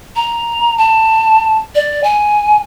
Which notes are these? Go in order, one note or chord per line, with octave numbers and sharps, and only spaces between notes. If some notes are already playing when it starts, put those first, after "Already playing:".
A#5
A5
D5
G#5